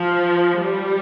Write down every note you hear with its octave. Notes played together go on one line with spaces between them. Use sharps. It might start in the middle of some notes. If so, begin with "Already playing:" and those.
Already playing: F3
G3